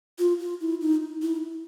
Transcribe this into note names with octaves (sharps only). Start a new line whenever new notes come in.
F4
F4
E4
D#4
E4